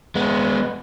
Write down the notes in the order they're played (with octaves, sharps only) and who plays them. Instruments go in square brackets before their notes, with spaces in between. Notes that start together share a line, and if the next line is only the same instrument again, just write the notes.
[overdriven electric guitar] G#3 B3